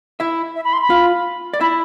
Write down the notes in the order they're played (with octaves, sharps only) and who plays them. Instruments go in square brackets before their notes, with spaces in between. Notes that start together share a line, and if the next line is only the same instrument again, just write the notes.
[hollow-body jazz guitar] E4 E5
[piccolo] E5
B5
C6
B5
[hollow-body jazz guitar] F4 F5
D5
[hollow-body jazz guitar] E4 E5 [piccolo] B5